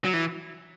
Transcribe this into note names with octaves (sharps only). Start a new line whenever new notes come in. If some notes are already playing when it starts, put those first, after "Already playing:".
F#3
E3